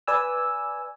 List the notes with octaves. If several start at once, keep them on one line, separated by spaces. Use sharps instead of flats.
B4 D5 G#5 E6